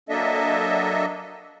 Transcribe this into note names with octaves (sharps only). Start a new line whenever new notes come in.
F#3 A#3 D4 A4 D#5 E5